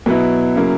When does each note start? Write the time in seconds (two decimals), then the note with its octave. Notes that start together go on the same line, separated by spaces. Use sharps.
0.06 B2 F#3 B3 E4 B4
0.56 C#3 F#3 A#3 E4